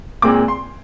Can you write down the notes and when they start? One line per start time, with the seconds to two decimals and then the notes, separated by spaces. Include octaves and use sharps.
0.22 A#2 G#3 C4 D6
0.48 C6